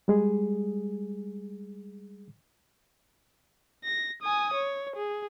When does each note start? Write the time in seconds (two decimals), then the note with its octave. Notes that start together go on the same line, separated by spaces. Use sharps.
0.08 G3 G#3 G#4
3.84 A#6
4.22 G#5 D#6
4.54 C#5
4.96 G#4